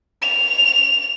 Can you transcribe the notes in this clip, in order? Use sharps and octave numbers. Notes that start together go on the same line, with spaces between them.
F7